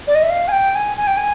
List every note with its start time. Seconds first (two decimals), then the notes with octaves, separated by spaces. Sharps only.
0.07 D5
0.15 D#5
0.22 E5
0.29 F5
0.48 G#5
0.51 G5
0.75 G#5
0.96 G#5
1.06 G5
1.16 G#5